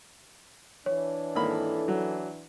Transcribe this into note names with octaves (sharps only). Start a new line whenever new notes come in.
E3 D4 C#5
G#1 A#3 E4 A4 B5
F#3